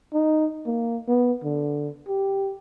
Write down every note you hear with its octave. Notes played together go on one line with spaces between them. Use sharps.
D#4
A#3
B3
D3
G4